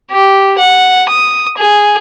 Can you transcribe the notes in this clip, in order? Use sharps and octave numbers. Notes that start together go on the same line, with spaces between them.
G4
F#5
D#6
G#4